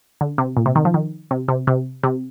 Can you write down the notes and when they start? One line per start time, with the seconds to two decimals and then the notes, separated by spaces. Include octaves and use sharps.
0.21 D3
0.38 C3
0.57 A#2
0.66 C3
0.75 D#3
0.85 F3
0.94 D#3
1.31 C3
1.48 C3
1.67 C3
2.03 C3